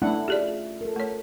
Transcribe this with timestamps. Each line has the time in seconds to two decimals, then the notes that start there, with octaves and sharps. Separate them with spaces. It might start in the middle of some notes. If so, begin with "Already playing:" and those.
0.02 A3 C#4 D4 E4 F#5
0.28 F4 G4 G#4 D5
0.81 A4 A#4
0.96 A3 C#5